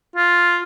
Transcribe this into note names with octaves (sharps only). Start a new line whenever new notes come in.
F4